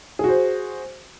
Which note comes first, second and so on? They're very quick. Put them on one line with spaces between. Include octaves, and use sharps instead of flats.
G#4 F#4 C5